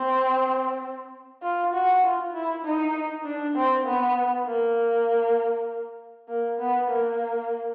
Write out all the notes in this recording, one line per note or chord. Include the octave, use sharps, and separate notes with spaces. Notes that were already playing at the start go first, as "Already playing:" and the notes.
Already playing: C4
F4
F#4
F4
E4
D#4
D4
C4
B3
A#3
A#3
B3
A#3